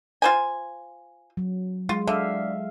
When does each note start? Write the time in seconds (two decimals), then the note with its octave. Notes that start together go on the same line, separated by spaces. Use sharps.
0.22 F4 C5 G#5
1.37 F#3
1.89 G#3 F4
2.07 D3 E5 F5